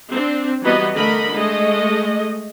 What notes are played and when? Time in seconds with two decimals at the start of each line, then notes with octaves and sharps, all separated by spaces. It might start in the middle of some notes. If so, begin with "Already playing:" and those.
0.12 C4 D4
0.62 E3 F#3 G3 B3 B4 D#5
0.95 D3 A3 A#4 D#5 B5
1.33 G#3 A3 D#5